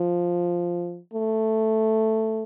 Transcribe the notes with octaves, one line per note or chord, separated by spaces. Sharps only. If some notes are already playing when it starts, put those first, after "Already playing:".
Already playing: F3
A3